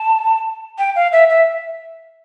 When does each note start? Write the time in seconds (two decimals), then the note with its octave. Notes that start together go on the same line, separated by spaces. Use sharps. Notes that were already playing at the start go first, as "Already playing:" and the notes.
Already playing: A5
0.78 G5
0.96 F5
1.12 E5
1.29 E5